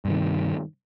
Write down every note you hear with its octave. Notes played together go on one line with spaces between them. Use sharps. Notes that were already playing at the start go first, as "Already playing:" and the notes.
G2 C3 D#3